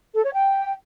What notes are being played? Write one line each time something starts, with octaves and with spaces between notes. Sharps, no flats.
A4
C#5
G5